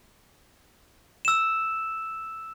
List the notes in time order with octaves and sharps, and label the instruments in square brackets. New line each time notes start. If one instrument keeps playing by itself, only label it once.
[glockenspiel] E6 E7